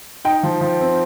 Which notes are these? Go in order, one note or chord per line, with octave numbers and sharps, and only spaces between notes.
D#4 G5
F3
F3
C4